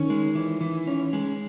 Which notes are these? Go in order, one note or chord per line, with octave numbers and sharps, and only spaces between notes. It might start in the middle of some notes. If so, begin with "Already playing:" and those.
Already playing: D#3 C#4
G#3
E3
E3
C#4
G#3